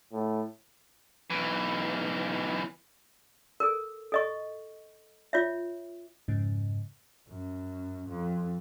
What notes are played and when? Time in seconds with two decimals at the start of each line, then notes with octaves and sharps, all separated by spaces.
0.13 A2
1.30 B1 E3
3.60 A4 A#4
4.12 A4 D#5 C#6
5.33 F4 C#5 E5
6.28 F2 G#2 C#3
7.28 F#2
8.08 F2